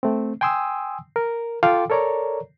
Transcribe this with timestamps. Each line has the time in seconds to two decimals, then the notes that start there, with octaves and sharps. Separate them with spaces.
0.03 A3 C4
0.41 G5 G#5 C6 D#6 E6
1.16 A#4
1.63 F4 A4 F5 G5 C6 D6
1.90 A4 A#4 C#5 D5 A#5